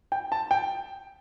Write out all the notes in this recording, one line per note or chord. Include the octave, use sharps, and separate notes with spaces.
G5
A5
G5